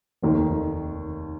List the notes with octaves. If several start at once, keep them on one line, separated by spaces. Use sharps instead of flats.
F1 D#2 D#3